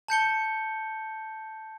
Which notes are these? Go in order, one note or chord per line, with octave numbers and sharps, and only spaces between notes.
A5 G6 C#7 G7